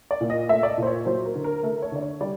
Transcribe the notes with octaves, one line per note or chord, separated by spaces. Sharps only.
D5
A#2
D#5
A3 E5
D5
D#5
A#2 C5
C#5
F#3 C5
A#4
D3
A#4
A3 A#4
C#5
D3 D5
C#5
G3 D5